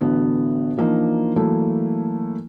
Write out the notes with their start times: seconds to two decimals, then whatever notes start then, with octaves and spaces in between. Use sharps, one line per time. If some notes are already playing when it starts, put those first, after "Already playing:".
0.01 A1 D3 B3 F#4
0.77 E3 F3 A#3 D4 D#4
1.36 E3 F#3 A3 A#3 E4